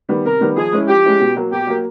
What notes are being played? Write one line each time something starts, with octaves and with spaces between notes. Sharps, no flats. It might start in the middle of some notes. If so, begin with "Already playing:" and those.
D#3 G3 B3
C3 A#4
D#3 G3 B3
F3 G#4
G#3 C#4 E4
F3 G4
G#3 C#4 E4
B2
F#3 A#3
B2 G4
F#3 A#3